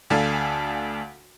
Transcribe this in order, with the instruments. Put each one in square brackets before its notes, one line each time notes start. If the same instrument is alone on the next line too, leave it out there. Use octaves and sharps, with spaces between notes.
[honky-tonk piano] D2 D4 A4 F5 G#5